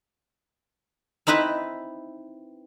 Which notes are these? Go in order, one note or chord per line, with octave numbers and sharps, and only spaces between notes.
C4 D#4 E4 B4 E5 B5